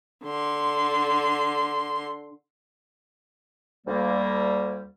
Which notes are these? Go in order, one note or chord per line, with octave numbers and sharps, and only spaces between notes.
D3 C6
D2 G3 A#3